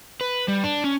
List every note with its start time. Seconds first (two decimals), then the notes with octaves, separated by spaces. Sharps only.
0.21 B4
0.48 G3
0.64 D4
0.84 C#4